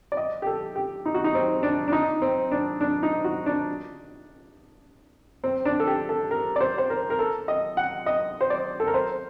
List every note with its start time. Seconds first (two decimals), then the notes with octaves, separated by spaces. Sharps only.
0.12 D5
0.17 D#5
0.42 G4
0.47 A4
0.76 G4
1.05 D#4
1.14 F#4
1.24 D#4
1.35 C4
1.63 D4
1.88 D4
1.92 D#4
2.22 C4
2.51 D4
2.81 D4
3.03 D#4
3.24 F#4
3.46 D4
5.44 C4
5.65 D4
5.80 A4
5.87 G4
6.09 A4
6.31 A#4
6.56 D5
6.61 C5
6.78 C5
6.90 A#4
7.10 A#4
7.19 A4
7.48 D#5
7.77 F#5
8.06 D#5
8.41 C5
8.50 D5
8.80 A4
8.87 A#4
8.94 C5